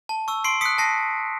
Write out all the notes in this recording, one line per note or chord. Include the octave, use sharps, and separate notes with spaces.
A5
C#6 E6
C6 C7 D7
D#6 F#6 B6 C#7
A5 A#6 C7